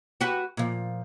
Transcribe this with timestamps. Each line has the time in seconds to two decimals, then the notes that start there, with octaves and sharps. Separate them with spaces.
0.21 F#4 G4 B4
0.57 A#2 F3